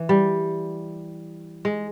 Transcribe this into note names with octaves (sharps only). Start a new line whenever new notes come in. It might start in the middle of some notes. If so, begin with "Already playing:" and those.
Already playing: E3
G3
G#3